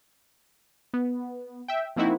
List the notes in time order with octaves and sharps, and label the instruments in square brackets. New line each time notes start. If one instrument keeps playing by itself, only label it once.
[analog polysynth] B3
E5 G5
F3 A#3 C4 D#4 E4 F#4